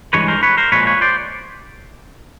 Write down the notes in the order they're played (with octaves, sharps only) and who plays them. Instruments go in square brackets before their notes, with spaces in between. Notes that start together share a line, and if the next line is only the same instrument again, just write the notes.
[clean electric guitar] G2 E3 G#3 B4 C#5
A#4 C5
B4 C#5
A#4 C5
A#2 F3 G#3 B4 C#5
B4 C#5
C5 D5